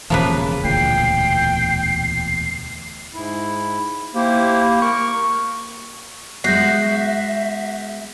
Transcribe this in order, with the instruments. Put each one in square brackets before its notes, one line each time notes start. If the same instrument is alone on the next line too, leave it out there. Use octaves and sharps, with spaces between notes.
[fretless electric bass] E1 C#3 [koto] F3 A#3 B4
[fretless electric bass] E1 D2 A#2 [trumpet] G5 [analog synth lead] C7
[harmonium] G#2 E4
[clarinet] A#3 [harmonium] E4 G4 C5
[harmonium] A#4 [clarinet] C#6
[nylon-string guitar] G#3 B3 [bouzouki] F#4 [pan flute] E5 [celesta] G6 A#6 C7